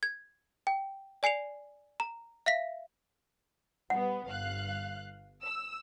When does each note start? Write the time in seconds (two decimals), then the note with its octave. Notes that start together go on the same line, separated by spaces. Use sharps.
0.03 G#6
0.67 G5
1.23 D5 G#5 C7 C#7 F7
2.00 A#5
2.46 E5 F5 A#6 B6
3.90 G3 B3 F#5
4.28 G1 F5 F#6
5.42 E6